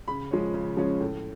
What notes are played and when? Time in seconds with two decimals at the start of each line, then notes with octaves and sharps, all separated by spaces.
0.08 C#3 B5
0.31 F3 G#3 C#4
0.54 C#3
0.77 F3 G#3 C#4
1.00 A2